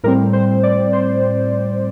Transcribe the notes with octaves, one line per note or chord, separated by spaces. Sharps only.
A2 G3 C4 A#4
C5
D5
C5